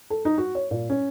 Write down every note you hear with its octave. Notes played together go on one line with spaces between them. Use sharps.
A4
D#4
F#4
C#5
A#2
C#4